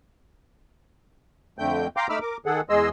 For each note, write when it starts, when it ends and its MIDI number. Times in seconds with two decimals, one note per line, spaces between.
1.59 1.87 41
1.59 1.87 50
1.59 1.87 57
1.59 1.87 79
1.59 1.87 91
1.97 2.07 77
1.97 2.07 79
1.97 2.07 82
1.97 2.07 84
1.97 2.07 86
1.97 2.07 91
2.09 2.19 57
2.09 2.19 63
2.09 2.19 83
2.09 2.19 86
2.09 2.19 88
2.09 2.19 89
2.21 2.37 70
2.21 2.37 86
2.46 2.61 51
2.46 2.61 68
2.46 2.61 69
2.46 2.61 78
2.70 2.89 40
2.70 2.89 56
2.70 2.89 68
2.70 2.89 75
2.70 2.89 84
2.70 2.89 88